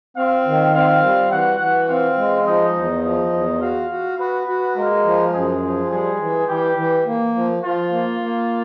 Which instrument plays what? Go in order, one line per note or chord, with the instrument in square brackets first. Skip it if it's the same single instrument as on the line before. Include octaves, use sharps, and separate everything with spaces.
[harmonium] C4 [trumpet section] F4 F5
[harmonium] D#3
[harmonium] C4 [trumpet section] F4 F5
[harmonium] G3
[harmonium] E3 [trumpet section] F#4 F#5
[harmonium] E3
[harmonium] C4 [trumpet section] F4 F5
[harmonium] G#3
[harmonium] F3 [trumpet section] D#4 D#5
[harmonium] E2
[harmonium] F3 [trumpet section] D#4 D#5
[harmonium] E2
[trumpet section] F4 F5 [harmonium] F#4
[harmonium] F#4
[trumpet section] B3 B4 [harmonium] F#4
[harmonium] F#4
[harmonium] G#3 [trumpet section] A#3 A#4
[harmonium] F3
[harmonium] F#2 [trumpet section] G#3 G#4
[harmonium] F3
[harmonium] G3 [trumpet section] G#3 G#4
[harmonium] E3
[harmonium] E3 [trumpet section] G3 G4
[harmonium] E3
A#3
F3
[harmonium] F3 [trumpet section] F4
[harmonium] A#3
A#3